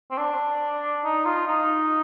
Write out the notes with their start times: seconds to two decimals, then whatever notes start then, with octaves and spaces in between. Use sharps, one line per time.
0.11 C4
0.18 D4
1.04 D#4
1.25 F4
1.47 D#4